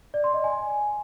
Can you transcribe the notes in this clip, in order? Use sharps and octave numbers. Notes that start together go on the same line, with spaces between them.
D5
C6
D#5
G#5